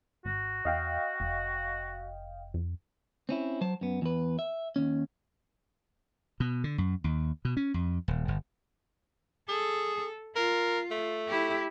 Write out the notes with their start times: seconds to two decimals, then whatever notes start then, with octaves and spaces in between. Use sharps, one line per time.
0.25 G#1 F#4
0.65 E2 D#5 F5 G5
1.20 F1
2.54 F2
3.29 C4 C#4 E4
3.61 F#3 C5 A5
3.81 F#2 B3
4.02 E2 B4
4.39 E5
4.76 D#2 C#4
6.40 B2
6.64 D3
6.78 F#2
7.04 D#2
7.45 B2
7.57 C#4
7.74 F2
8.08 D#1
8.28 G1
9.49 G#4 A4
10.36 F4 A#4
10.91 A3
11.28 E4 G4